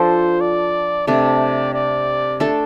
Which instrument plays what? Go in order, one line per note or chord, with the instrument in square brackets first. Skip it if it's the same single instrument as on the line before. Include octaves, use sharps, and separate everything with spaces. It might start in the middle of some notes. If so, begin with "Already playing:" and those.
Already playing: [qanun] F3 D4 A4 [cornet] C5
[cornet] D5
[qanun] C3 A3 D4 [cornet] D5
[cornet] D5
[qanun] A3 D4 A4